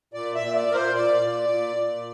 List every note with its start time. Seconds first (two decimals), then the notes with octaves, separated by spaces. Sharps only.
0.14 A#2 D5
0.35 E5
0.41 A#2
0.55 D5
0.68 A#2 A#4
0.75 C5
0.95 A#2 D5
1.22 A#2
1.49 A#2
1.77 A#2